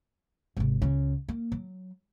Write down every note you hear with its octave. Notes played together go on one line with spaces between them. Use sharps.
G#1 C3
C#2 C#3
A#3
F#3